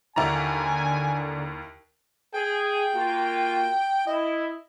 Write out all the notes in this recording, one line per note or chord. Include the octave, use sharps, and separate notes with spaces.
D#2 D3 E4 G#5 A#5
G#4 G5
A#3 F4 F#4
E4 D#5